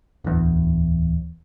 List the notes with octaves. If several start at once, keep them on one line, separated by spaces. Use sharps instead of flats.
D1 E2